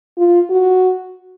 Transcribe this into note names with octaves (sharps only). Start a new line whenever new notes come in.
F4
F#4